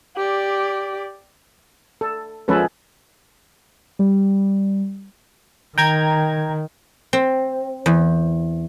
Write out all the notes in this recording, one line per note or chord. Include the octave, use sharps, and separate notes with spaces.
G4 D5
A4
F3 G#3 C#4 A4 B4
G3
D#3 G5 A#5 G#6
C4
E2